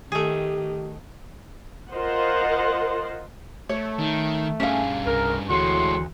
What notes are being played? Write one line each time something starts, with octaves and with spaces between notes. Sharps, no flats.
D#3 A3 G4 G#4
F4 A#4 C5 D#5 F#5
A3 C#5
D#3
G2 C#4 G#4 F5
C2 A#4
D2 A2 E3 G#3 F#4 C6